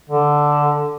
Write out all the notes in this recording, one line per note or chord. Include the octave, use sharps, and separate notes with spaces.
D3